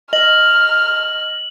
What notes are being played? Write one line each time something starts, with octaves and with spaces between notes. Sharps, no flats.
D#5 F6 F#7